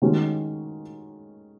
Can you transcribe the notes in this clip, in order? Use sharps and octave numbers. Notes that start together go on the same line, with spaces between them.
D#3 G#3 C#4 F#4